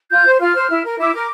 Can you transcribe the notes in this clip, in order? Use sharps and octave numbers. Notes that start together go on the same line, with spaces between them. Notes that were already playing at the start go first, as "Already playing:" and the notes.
F4 G6
C5
F4 F6
C5
E4
A#4
E4 D6
A#4